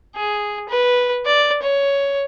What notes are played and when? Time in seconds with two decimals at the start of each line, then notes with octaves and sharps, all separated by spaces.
0.16 G#4
0.69 B4
1.26 D5
1.62 C#5